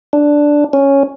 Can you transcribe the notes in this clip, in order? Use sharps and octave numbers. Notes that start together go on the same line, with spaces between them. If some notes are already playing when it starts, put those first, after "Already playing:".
D4
C#4